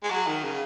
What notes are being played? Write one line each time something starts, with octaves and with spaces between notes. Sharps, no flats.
G#3
F#3
D#3
C#3